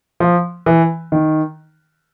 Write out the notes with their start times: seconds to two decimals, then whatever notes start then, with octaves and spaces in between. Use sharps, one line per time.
0.20 F3
0.66 E3
1.12 D#3